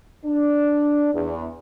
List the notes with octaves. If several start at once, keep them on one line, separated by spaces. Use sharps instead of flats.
D4
E2